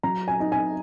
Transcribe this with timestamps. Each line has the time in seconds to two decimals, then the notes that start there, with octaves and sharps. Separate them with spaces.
0.03 F#3 A#5
0.28 G#5
0.40 D#4
0.52 G#5